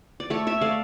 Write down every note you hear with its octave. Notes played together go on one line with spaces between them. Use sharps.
D5
A3 A4 C#5
C#5 E5
A3 D5 F5